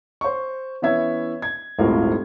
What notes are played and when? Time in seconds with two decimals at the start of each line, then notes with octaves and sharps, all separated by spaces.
0.21 C5 C#6
0.82 E3 B3 C#4 E5 G#6
1.42 G#6
1.78 D#1 G#1 A2 F4 A#4 F5